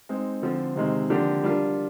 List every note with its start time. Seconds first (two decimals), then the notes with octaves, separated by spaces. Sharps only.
0.09 G#3 C4 D#4
0.42 D3 F3 C4
0.76 C3 D#3 G#3 C4
1.10 D3 F3 A#3 D4 G4
1.43 G3 D4 F4 A#4